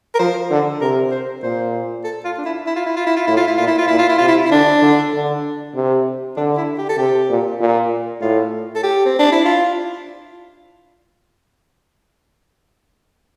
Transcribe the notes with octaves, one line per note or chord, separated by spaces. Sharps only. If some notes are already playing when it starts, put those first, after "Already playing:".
A#4
F3 C5
D3
C3 A#4
C5
A#2 C5
A4
F4
D4
E4
E4
F4
E4
F4
E4
F4
A2 E4
F4
E4
A#2 F4
E4
F4
A#2 E4
F4
E4
C3 F4
E4
E4
D3 D4
D3
D3
C3
D3 D4
E4
G4
A4
C3 G4
A#2
A#2
A2 F4
A4
G4
C4
D4
E4
F4